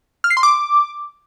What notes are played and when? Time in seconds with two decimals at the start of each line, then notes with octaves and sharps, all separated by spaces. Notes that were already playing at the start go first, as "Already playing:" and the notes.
0.24 F6
0.30 C7
0.37 C6
0.43 D6